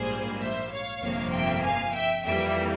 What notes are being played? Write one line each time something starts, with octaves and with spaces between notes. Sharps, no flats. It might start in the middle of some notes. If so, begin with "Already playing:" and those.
Already playing: A#1 G#2 G3 A#3 G#4 C5
C5 E5
C#5 F5
G1 F2 C3 F3 A#3
E5 G5
F5 G#5
E5 G5
F2 E3 G3 A#3 E5 G5